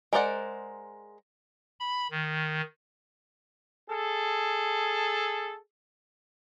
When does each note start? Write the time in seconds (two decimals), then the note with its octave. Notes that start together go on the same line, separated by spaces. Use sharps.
0.13 G#3 A#4 C5 D5 F#5
1.80 B5
2.11 D#3
3.89 G#4 A4